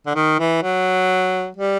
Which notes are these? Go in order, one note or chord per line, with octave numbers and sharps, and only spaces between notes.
D3
D#3
E3
F#3
G3